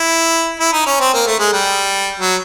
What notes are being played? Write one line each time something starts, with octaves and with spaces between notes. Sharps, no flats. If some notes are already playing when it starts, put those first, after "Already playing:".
Already playing: E4
E4
D#4
C#4
C4
A#3
A3
G#3
G3
F#3